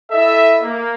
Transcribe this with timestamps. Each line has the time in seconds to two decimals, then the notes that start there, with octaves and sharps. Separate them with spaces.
0.11 E4 A4 D#5 E5
0.62 A#3